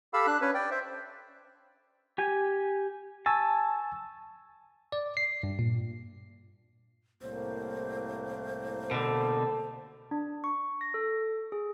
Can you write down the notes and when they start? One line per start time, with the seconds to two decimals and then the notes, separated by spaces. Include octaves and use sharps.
0.14 G4 A4 F5 B5 E6
0.27 D4 F#6
0.41 C#4 B4
0.54 D5 G5
0.71 C5 E5
2.18 G4 G#5
3.26 G#5 A5 C#6 E6
4.92 D5
5.17 C7
5.43 G2
5.59 A#2
7.22 C2 A2 A#3 C5
8.91 B2 D3 A4
10.11 D4
10.44 C#6
10.81 A#6
10.94 A4
11.52 G#4